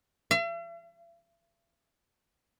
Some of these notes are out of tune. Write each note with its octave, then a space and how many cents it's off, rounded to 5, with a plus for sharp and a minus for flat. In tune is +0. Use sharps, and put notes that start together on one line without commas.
E5 +45